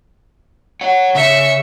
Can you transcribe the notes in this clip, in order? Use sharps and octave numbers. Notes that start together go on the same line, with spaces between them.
C#5 F#5
C#3 E5 C#7